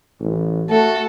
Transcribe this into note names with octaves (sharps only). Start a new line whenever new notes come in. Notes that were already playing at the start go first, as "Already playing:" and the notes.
A1
A3 F#4 A4